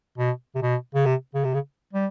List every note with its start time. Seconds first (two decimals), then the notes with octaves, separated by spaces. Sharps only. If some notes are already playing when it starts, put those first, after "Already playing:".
0.18 B2
0.55 C3
0.62 B2
0.95 C#3
1.06 C3
1.35 C#3
1.45 C3
1.54 C#3
1.93 G3